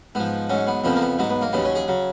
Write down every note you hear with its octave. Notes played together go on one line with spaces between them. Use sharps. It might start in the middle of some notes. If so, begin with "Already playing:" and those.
G#2 F3 B3
G#2 F#3 C#4
B3
F2 C#3 F3 B3
A#3
B3
G#2 F#3 B3
B3
A#3
D#2 C#3 F#3 B3
C#4
G#4
C#3 F#3